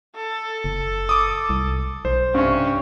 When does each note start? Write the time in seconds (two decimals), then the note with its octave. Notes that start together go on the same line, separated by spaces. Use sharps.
0.15 A4
0.64 F#1
1.09 D6 D#6
1.50 C2
2.05 B1 C5
2.34 G2 C3 C#4